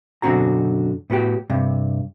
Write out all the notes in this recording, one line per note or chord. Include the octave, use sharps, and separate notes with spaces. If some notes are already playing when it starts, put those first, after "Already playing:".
F#2 B2 D3 C4 F#4 A#5
A2 B3 F#4 G4
G2 C3